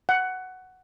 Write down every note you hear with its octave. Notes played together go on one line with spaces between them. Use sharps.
F#5